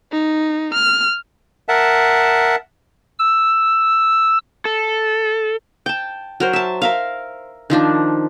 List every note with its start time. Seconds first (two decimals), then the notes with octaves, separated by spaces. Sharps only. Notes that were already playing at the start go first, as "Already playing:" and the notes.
0.12 D#4
0.74 F6
1.69 A#4 E5 F#5 A5
3.19 E6
4.65 A4
5.86 G5 A5
6.40 F#3 A#4 C5
6.53 E5 A5
6.82 A#4 E5 F5
7.70 D#3 F3 D4